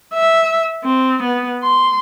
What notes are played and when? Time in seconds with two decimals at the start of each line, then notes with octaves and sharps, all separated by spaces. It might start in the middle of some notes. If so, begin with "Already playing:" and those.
0.14 E5
0.84 C4
1.22 B3
1.63 C6